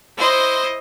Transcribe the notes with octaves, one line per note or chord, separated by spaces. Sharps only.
E4 C5 D#5